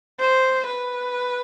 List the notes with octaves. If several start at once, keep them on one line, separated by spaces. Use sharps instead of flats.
C5
B4